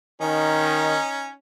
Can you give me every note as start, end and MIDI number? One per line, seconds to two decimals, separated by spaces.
0.21 0.96 51
0.21 1.31 61
0.21 1.31 63